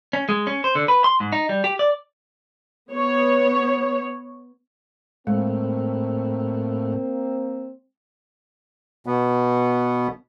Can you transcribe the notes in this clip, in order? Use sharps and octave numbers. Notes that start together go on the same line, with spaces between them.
C#4
G#3
C#4
C5
D3
B4
C6
G#2
D#4
G3
G4
D5
B3 C#5
A2 G#3 A#3 C4
B2 B3